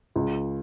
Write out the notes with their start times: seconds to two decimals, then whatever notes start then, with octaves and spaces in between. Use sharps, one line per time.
0.16 C#2